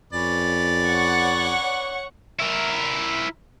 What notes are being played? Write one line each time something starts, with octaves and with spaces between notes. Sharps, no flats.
F2 C#4 B4 D5 A6
C#5 F#5 C#6
E4 A#4